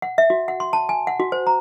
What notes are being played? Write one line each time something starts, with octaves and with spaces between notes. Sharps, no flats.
F#5
E5
F#4
F#5
C6
A5
G#5
F#5
F#4
C5
A#5